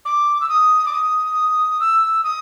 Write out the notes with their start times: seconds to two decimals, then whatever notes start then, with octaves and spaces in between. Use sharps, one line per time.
0.05 D6
0.40 E6
0.48 D#6
0.86 D6
0.93 D#6
1.80 E6
2.23 D#6